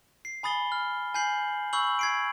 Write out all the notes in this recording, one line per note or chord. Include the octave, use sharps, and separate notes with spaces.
C7
G#5 B5 D#6 A6 C7 G7
F6
G#5 G6 C7 F#7
B5 C#6 E6 G6 F#7
G#6 C7 D7